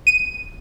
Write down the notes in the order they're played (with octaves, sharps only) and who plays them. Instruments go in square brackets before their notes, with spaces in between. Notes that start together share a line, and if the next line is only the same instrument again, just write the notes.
[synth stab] D#7